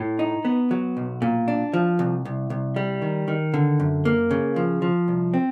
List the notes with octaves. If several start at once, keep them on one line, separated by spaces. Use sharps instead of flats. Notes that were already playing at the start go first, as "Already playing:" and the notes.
Already playing: A2
D#4
B3
F#3
B1
A#2
D4
F3
C2
C2
C2
G3
D#3
D#3
D3
F#2
A#3
C#3
F3
F3
C2
C4